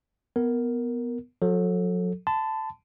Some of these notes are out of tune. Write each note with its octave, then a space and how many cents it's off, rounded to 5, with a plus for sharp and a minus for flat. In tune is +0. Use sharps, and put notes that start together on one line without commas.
B3 +0 A#4 +0
F#3 -40 A4 +0
A5 +0 C6 -45